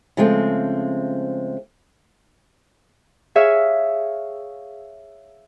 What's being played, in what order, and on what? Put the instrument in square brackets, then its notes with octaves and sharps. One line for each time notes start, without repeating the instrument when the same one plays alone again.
[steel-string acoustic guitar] C#3 F3 G#3 A3 C4
[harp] G#4 C#5 E5 F5 G#5